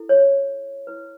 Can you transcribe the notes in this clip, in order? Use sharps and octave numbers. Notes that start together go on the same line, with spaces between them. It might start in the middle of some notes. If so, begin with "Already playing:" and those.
Already playing: E4 A4
C#5
E4 B4